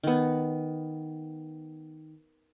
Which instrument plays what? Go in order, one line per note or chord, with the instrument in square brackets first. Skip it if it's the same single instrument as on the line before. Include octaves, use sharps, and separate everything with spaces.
[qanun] D#3 B3